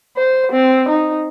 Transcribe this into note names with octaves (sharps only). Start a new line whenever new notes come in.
C5
C4
D#4